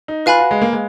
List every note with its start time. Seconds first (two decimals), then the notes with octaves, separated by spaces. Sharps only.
0.08 D#4
0.26 F4 B4 F5 G#5 B5 F#6
0.40 F#4
0.51 G#3
0.62 A#3
0.73 G#3